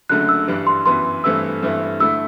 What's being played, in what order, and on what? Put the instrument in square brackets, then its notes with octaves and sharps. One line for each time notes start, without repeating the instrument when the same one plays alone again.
[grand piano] F#1 F#2 D3 A3 [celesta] F#6
[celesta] E6
[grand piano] G2 E3 G3 D4
[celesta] C6
[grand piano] F#2 E3 B3 [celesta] C6
[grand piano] G2 E3 A3 C4 E4 [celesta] E6
[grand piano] G2 E3 A3 C4 E4
[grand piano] D3 A3 E4 [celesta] E6